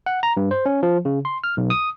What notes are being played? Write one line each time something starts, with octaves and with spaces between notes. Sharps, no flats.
F#5
A#5
G2
C5
C#4
F3
C#3
C6
F6
B1
D#6